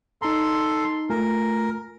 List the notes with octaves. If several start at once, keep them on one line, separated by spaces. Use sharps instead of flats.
D#4 A4 A#5 C6
A3 F4 A#4 G#5